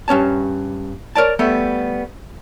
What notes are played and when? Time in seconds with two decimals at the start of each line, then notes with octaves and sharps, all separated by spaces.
0.08 G2 C#4 C#5 A5
1.15 A#4 C#5 D5 A5
1.39 G3 A3 B3 A4